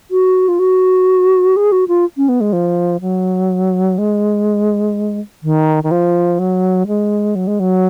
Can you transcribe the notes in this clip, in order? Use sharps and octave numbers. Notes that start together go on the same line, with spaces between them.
F#4
F4
F#4
G#4
F#4
F4
C#4
B3
G#3
F3
F#3
G#3
D#3
D#3
F3
F#3
G#3
F#3
G#3
F#3